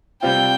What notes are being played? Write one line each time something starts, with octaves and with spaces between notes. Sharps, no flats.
C3 G3 C4 F4 G5